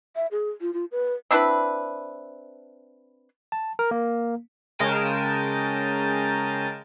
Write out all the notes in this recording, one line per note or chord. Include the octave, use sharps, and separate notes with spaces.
E5
G#4
F4
F4
B4
C4 D4 E4 B4
A5
A#4
A#3
C#3 G#3 A#4 G5 A5 D#7